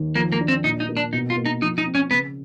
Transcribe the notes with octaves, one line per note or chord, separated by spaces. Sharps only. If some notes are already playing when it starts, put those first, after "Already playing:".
Already playing: D#2
F3 A#3
A#3
D4
C4
A#2 D#4
D#4
A#3
D4
B2 D#4
F4
A#3
D#4
F3 D#4
D#4
C4
C#4
C#3 B3